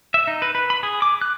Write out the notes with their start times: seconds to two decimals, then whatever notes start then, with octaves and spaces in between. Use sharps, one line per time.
0.14 E5
0.27 D#4
0.42 B4
0.55 B4
0.70 B5
0.83 G#4
1.02 D6
1.21 F#6